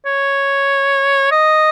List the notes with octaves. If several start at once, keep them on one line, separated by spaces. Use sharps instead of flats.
C#5
D#5